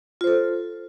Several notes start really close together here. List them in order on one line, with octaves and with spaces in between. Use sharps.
F4 C5 A4